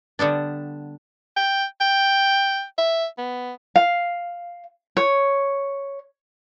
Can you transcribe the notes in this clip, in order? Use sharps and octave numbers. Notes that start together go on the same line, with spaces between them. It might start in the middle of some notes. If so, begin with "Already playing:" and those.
D3 G3 B3 D4
G5
G5
E5
B3
F5
C#5